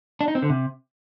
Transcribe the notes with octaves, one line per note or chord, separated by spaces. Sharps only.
D4
D#4
C4
D3
C3